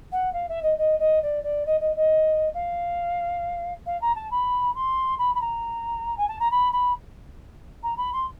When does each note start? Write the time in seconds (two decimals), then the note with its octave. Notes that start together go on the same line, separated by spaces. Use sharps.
0.12 F#5
0.33 F5
0.49 E5
0.63 D#5
0.78 D#5
0.99 D#5
1.23 D5
1.44 D5
1.66 D#5
1.81 D#5
1.96 D#5
2.54 F5
3.86 F5
4.02 A#5
4.16 A5
4.31 B5
4.75 C6
5.19 B5
5.35 B5
5.41 A#5
6.18 G#5
6.28 A5
6.40 A#5
6.51 B5
6.73 B5
7.83 A#5
7.97 B5
8.13 C6